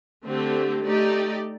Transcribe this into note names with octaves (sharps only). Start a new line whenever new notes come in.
D3 A3 C4 G4
A3 D#4 G4 D5